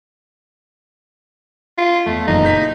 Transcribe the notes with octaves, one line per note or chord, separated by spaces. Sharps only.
F4
E2 A3
F#1 A#2 E3 D#4
G6 B6